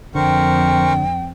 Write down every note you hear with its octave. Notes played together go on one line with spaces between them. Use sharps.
F2 D3 A#4 C5 G5 C#6